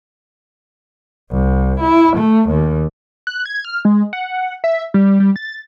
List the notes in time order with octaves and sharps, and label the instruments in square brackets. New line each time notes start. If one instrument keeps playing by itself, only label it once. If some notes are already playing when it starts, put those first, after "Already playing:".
[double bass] C2
E4
A3
D#2
[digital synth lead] F#6
G#6
F6
G#3
F#5
E5
G3
G3
A6